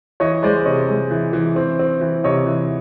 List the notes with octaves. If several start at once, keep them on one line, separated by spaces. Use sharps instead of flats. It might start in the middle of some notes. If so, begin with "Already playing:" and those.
E3 C#5 D#5
G#3 C5 D5
C3 C#5 D#5
G#3
E3
E3
C4
C4
E3
C3 C#5 D#5
E3